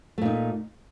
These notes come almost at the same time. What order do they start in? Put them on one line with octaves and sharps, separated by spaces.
A3 A#2 D#4